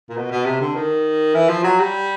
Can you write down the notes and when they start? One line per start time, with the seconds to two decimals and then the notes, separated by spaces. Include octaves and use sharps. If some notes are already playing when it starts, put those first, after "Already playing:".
0.09 A#2
0.17 B2
0.31 B2
0.45 C3
0.61 D3
0.75 D#3
1.34 E3
1.49 F3
1.64 F#3
1.80 G3